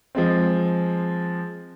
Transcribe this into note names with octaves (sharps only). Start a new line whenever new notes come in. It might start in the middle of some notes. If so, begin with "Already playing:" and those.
F3 G#3 C4